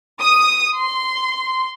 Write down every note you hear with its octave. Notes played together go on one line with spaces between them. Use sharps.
D#6
C6